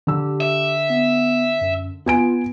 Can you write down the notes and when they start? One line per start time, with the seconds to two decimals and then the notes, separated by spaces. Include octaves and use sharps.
0.07 D3 G4 E6
0.41 E5
0.90 B3
1.61 F#2
2.06 B3 F4 G#5 D7